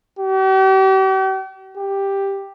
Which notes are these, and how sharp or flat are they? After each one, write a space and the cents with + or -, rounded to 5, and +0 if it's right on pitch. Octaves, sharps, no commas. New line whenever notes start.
G4 -45
G4 +5